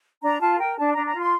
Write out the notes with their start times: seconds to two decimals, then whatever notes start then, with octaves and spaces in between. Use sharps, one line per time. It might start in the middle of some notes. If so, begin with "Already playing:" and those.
0.22 D4 A#5
0.40 F4 A5
0.59 A#4 G5
0.77 D4 A5
0.92 D4 A#5
1.05 A#5
1.15 F4 C6